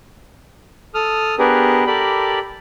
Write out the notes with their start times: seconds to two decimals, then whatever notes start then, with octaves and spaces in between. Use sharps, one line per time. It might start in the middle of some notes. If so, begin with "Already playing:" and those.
0.94 A4 D#6 F6
1.39 B3 D4 G4 G#4 A#4 B4
1.87 G4 A4 A#4 D5 B5